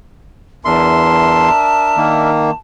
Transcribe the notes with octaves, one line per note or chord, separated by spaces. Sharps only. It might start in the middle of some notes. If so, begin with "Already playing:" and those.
E2 D4 A#4 E5 A5 C6
D#3 A#3